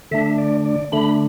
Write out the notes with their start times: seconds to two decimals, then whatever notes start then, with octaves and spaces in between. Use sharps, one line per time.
0.11 D3 A3 D4 E5
0.38 D5
0.66 D5
0.92 D3 A3 D4 B5